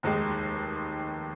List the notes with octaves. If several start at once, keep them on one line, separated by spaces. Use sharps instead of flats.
F1 D#2 D#3 G#3